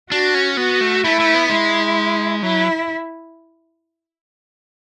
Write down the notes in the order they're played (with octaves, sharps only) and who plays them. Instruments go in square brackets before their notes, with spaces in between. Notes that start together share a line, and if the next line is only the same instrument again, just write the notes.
[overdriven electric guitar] D4 [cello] F#4
[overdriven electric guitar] C#4
[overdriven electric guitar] B3 [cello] F#4
[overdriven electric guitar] A3
[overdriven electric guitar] A3 [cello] E4
[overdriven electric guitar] A3
B3
[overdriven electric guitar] G#3 [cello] E4
[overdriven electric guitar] F#3 [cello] E4